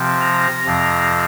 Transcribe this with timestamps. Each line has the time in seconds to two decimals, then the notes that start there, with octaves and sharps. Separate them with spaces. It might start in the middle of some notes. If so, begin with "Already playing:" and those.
Already playing: C3 F3 C4
0.21 A#5
0.65 F2 C3 F3 C4